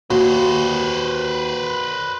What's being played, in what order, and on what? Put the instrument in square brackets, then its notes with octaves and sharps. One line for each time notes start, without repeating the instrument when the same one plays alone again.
[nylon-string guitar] D#2 [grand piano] F#4 [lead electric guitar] B4 C5